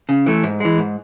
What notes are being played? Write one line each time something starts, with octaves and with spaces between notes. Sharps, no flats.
C#3
E3 A3
G#2
E3 G#3
G#2